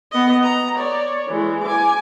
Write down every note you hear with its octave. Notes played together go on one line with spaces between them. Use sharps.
B3 D#5
A#5
C#5 D5
E3 G#3
G#5 D6